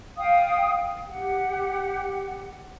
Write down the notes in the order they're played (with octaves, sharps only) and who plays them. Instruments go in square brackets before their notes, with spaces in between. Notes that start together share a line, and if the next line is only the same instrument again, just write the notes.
[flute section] F5 G5 D#6
G4 F#5